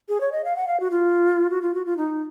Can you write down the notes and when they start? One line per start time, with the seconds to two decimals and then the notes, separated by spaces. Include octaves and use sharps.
0.09 G#4
0.21 C#5
0.32 D#5
0.44 F5
0.56 F#5
0.68 F5
0.80 F#4
0.91 F4
1.50 F#4
1.62 F4
1.75 F#4
1.86 F4
1.97 D#4